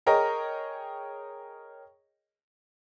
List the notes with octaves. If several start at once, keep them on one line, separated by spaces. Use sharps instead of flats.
G#4 A#4 C#5 D#5 G5